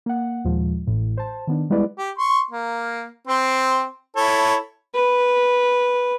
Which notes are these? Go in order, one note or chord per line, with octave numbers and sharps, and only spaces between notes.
A#3 F#5
D#2 A#2 F3 G#3
A1 A2
C5 A5
D#3 B3 D4
G3 G#3 B3 E4 B4 D5
G4
C6 C#6
A#3
C4 C5
E4 A4 C#5
B4